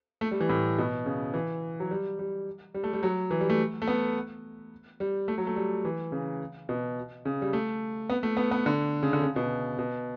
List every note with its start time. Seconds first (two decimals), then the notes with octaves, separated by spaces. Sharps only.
0.21 A3
0.31 G3
0.40 E3
0.49 A2
0.78 B2
1.06 C#3
1.34 E3
1.80 F#3
1.91 G3
2.19 G3
2.74 G3
2.84 A3
2.93 G3
3.03 F#3
3.31 E3
3.41 G3
3.50 A3
3.82 A3
3.88 B3
5.00 G3
5.28 A3
5.38 F#3
5.47 A3
5.56 G3
5.85 E3
6.12 C#3
6.69 B2
7.25 C#3
7.42 G3
7.53 A3
8.10 B3
8.23 A3
8.37 B3
8.51 B3
8.66 D3
9.03 C#3
9.13 D3
9.22 C#3
9.36 B2
9.79 B2